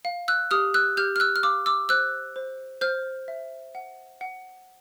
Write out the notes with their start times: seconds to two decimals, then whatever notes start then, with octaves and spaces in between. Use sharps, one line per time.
0.05 F5
0.28 E6 F#6
0.51 G4 D#6 F6
0.74 E6 F#6
0.97 G4 F6 G6
1.16 F6
1.20 E6 F#6
1.36 F6
1.43 F5 D6 E6
1.66 D6 E6
1.89 C5 E6 F#6
2.36 C5
2.81 C5 F6 G6
3.28 E5
3.75 F#5
4.21 F#5